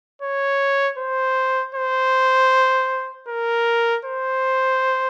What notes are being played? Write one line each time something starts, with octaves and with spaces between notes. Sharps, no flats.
C#5
C5
C5
A#4
C5